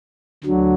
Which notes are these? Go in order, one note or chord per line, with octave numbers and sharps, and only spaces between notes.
D2 D3 F#3